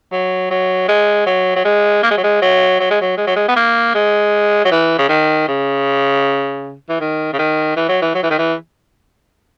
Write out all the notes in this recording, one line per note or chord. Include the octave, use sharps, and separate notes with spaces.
F#3
F#3
G#3
F#3
F#3
G#3
A#3
G#3
F#3
G#3
F#3
F#3
G#3
F#3
G#3
F#3
G#3
B3
A#3
G#3
F#3
E3
C#3
D#3
C#3
E3
D#3
C#3
D#3
E3
F#3
E3
F#3
E3
D#3
E3